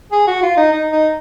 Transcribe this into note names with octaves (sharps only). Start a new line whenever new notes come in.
G#4
F#4
F4
D#4
D#4
D#4